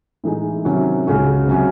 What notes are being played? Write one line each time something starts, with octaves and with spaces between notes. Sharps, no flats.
A2 E3 G#3 D#4
C3 D#3 F#3 C#4 F#4
C#2 C#3 G#3 C#4 F#4
C3 F#3 C#4 F#4